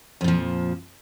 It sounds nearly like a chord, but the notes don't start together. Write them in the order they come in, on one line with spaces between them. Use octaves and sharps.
F2 A#2 F3